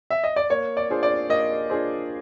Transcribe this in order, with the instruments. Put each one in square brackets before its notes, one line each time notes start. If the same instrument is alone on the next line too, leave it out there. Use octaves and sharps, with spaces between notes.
[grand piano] E5
D#5
D5
[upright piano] A#3 [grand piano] C#5
[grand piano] D5
[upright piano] D4 F4 G#4 C5
[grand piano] D5
[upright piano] A#3 [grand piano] D#5
[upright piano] D4 F4 G#4 C5